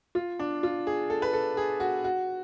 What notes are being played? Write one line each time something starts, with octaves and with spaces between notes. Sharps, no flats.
F4
D4
F4
G#4
A4
B4
A4
G#4
F#4
F#4